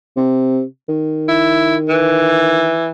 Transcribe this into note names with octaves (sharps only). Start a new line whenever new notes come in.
C3
D#3
E4
E3